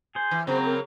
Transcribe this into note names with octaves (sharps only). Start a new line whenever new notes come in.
G#4 C5 G#5
E3
C#3 F#3 A#3 C4 C5
A#4